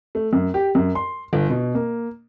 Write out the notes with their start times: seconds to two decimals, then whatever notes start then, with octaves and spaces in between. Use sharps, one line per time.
0.15 A3
0.33 F#2
0.54 G4
0.75 F#2
0.95 C6
1.33 G1
1.50 B2
1.75 A#3